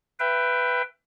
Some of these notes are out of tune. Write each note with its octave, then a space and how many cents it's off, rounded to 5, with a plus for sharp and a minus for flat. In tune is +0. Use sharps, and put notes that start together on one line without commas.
B4 +5 E5 +30 G5 +0